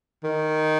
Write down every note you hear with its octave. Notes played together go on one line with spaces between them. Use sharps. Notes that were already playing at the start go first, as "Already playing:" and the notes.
D#3